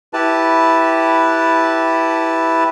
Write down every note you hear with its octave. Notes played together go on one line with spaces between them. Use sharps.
E4 G4 B4 A5